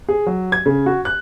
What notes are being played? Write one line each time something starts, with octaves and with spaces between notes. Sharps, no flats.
G#4
F#3
G#6
C#3
F#4
F#6